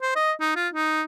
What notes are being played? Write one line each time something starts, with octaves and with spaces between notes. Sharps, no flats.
C5
D#5
D#4
F4
D#4